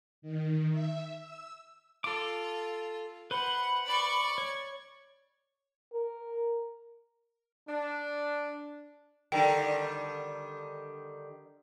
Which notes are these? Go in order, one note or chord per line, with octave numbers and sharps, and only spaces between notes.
D#3
E5
E6
F4 A4 D6
B4 C5 F#5 B5
D5 C#6
C#5
A#4
D4
D3 D#3 G3 G5